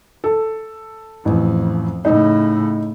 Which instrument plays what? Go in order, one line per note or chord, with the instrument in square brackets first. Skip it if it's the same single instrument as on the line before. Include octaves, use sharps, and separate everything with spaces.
[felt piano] A4
[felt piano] A1 [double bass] F2
[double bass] A2 C#3 [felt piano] D#4